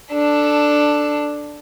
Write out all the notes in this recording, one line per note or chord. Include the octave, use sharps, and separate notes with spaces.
D4 A4